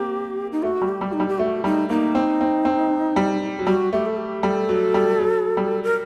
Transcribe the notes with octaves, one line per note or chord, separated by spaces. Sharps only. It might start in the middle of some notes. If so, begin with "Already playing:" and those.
Already playing: A#3 C4 G4
D#4
A3 F#4
G3
G4
G3
D#4
G3
G4
A3 F#4
G3 D#4
A#3 D#4
C4
C4
C4
G3
F#3
G3 F#4
A3 G4
A4
G4
G3 A4
F#3
G3
F#3
G3
A#4